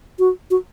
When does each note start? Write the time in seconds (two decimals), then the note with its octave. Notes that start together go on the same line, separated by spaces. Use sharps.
0.19 F#4
0.51 F#4